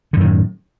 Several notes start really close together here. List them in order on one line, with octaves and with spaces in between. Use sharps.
D3 F#2 D#3 A2